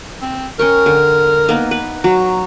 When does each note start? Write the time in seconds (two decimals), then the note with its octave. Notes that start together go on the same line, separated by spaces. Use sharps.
0.22 C4
0.59 C#4 A#4 G5 C#6
0.86 D3
1.49 A#3 B3 D#4
1.71 B4
2.04 F#3 A#5